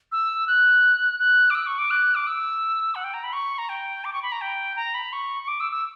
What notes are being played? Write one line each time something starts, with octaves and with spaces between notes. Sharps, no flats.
E6
F#6
F#6
D6
E6
C#6
D6
F#6
D6
E6
F#5
G5
A#5
B5
C#6
A#5
G5
D6
C#6
B5
A#5
G5
A#5
B5
C#6
C#6
D6
E6
E6